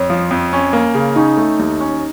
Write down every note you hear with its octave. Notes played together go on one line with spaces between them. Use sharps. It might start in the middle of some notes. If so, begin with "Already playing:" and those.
Already playing: F2 C#5
F3
F2
C#4
A#3
C#3
C#4 D#4
A3
D#2
C#4